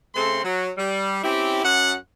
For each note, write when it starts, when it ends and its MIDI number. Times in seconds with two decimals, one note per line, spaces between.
0.15 0.40 49
0.15 0.40 57
0.15 0.40 60
0.15 0.40 69
0.15 0.40 84
0.44 0.71 54
0.78 1.19 55
1.23 1.60 60
1.23 1.60 61
1.23 1.60 64
1.23 1.60 67
1.64 1.94 42
1.64 1.94 78